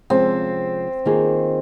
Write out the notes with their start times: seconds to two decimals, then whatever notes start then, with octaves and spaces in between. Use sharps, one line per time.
0.10 C3 F3 G#3 C4 C#4
1.06 D#3 A#3 F4 G#4